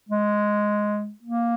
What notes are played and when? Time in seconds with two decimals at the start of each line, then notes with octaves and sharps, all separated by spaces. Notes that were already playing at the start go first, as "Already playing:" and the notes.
0.09 G#3
1.23 A#3